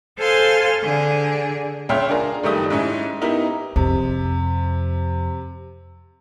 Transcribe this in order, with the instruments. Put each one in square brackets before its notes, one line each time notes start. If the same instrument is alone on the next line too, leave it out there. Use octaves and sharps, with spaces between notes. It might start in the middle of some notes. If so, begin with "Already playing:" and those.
[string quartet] A4 C5 F5 G#5 C6 F6
D3 G#4
[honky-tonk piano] C#2 C#5 E5 G5 C6 F6
D4 F4 G#4 A#4 A#5
F#1 D#3 G3 A3 G4 D#6
G#2 C#4 E4
B3 D#4 E4 G4 A#4
[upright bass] F2 [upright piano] C3